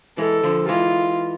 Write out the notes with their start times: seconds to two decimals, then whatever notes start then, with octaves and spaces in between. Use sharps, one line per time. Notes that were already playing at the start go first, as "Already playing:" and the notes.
0.18 E3 G#3 A4
0.43 D3 F3
0.69 E3 G#3 F4